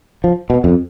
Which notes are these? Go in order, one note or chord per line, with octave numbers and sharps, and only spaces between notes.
F3
B2
F2